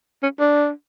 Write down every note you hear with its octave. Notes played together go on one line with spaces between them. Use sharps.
C#4
D4